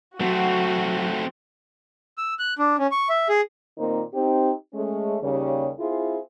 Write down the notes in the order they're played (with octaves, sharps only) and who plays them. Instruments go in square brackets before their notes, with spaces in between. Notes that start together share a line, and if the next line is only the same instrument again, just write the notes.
[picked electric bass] F#3 [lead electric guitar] A3 C4 [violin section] F#4
[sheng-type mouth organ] E6
F#6
D4
C#4
C#6
E5
G#4
[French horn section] A#2 D#3 A#3 C4 D#4
C4 D#4 G4
G#3 A3 C#4
D#2 C#3 G3
C4 E4 F4 G#4